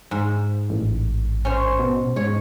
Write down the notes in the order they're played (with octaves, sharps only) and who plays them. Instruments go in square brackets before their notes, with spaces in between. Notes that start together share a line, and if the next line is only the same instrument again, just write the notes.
[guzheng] G#2
[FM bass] A1
[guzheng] C#4 C5
[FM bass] B2
[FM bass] G#2 [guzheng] C#5